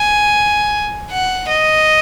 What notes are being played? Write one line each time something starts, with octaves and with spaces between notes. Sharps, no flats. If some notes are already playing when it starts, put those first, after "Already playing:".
Already playing: G#5
F#5
D#5